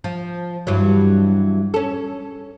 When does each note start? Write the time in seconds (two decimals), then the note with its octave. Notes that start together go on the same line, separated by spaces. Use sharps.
0.04 F3
0.67 G2 E3 F#3
1.74 C#4 A4